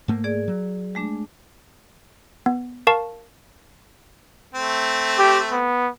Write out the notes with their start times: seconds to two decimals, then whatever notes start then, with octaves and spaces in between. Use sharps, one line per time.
0.08 G#2 A3 A#3
0.24 G#4 D5
0.48 F#3
0.95 G#3 A3 D4
2.46 B3
2.87 A#4 F5 A5 C#6
4.54 A3 C4
5.18 G4
5.52 B3